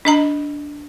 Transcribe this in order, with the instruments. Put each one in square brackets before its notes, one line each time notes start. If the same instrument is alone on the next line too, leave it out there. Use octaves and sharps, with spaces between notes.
[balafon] D4 D#5 A#5